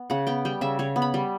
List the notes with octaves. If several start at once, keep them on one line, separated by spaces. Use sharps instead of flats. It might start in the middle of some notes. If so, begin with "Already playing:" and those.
Already playing: B3
C#3 F#5
B3 G5
G3 G5
C#3 E5
C#3 C#5
B3
B5
G3